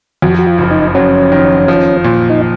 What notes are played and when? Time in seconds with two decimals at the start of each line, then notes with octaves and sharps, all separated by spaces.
0.22 F2 F#4
0.39 F#4
0.47 F4
0.58 F#1
0.71 D#4
0.95 F#3 C#4
1.32 D#3
1.68 F3
2.04 A#2
2.30 D#4